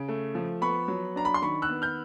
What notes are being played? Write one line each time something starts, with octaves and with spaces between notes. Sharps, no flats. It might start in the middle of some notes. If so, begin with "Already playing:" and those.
Already playing: C#3
A3
F3
B3 B5 C#6
F#3
D4 A#5
B5
C6
D#3 B5 C#6
E6 F#6
B3
F6 G6